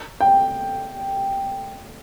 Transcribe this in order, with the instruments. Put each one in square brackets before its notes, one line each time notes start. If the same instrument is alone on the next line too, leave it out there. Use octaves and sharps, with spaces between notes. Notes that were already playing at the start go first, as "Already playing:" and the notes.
[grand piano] G5